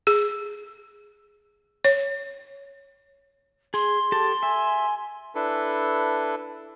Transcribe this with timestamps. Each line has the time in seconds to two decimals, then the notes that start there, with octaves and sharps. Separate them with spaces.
0.07 G#4
1.84 C#5
3.74 G#4 C6
4.12 G4 A4 A5
4.43 E5 G#5
5.35 D4 E4 A4 B4